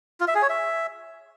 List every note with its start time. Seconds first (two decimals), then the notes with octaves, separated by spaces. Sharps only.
0.21 F4
0.28 E5
0.35 G#4
0.42 C#5
0.49 E5